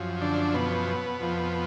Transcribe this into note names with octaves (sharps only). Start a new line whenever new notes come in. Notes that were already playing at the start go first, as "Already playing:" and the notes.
Already playing: F#2 F3
D3 D4
B2 B3
F2 F3